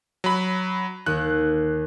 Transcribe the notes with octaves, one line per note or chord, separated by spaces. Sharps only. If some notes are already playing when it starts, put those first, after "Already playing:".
F#3 B5
D#2 F#6